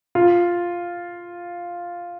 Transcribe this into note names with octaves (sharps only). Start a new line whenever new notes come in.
F4